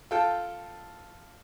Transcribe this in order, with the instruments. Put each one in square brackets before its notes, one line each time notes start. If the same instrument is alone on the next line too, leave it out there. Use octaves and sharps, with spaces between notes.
[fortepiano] F4 A4 G5